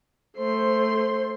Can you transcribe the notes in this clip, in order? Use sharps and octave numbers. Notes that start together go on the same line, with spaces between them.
A3 C5 C6